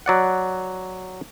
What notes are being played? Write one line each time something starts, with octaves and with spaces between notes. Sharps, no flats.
F#3 D5 F#5